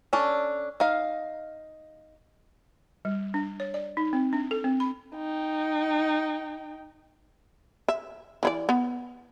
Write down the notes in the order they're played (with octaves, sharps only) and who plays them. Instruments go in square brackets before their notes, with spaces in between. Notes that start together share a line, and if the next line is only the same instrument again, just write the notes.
[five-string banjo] C#4 D4 A4
D#4 F5
[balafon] G3
D4
C#5
D5
D#4
C4
D4
A4
C4
B5
[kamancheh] D#4 G5
[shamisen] E5
E3 E4 D5
B3